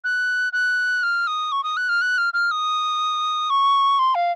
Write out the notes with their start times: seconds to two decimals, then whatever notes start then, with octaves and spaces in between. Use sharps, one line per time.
0.04 F#6
0.53 F#6
1.03 F6
1.27 D#6
1.52 C#6
1.64 D#6
1.77 F#6
1.89 F6
2.01 F#6
2.18 F6
2.34 F6
2.51 D#6
3.50 C#6
3.99 C6
4.15 F5